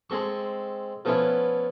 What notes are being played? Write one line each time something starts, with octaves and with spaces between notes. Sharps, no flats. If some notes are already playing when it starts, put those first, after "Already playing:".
G#3 C4 A4 C#6
F3 A3 B3 C#4 E4